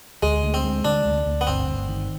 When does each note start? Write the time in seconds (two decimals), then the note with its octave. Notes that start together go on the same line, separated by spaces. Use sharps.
0.23 D2 G#3
0.43 D2
0.54 C4
0.64 G#3
0.85 D3 D4
1.06 D2
1.26 D2
1.41 B3
1.47 G1 C4
1.68 G1
1.89 D#3